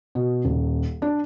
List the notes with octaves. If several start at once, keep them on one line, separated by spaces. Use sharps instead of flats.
B2
D#1
D4